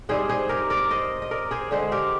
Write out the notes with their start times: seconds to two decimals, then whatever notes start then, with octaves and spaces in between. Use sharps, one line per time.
0.09 G#2 G3 C4 G#4 C5
0.29 G#4 C5
0.49 G4 A#4
0.70 A#4 D5
0.91 C5 D#5
1.22 D#5
1.31 A#4 D5
1.51 G#4 C5
1.71 D3 G#3 C4 G#4 C5
1.92 G4 A#4